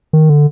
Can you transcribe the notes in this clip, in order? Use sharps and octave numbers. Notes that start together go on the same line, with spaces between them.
D#3
D3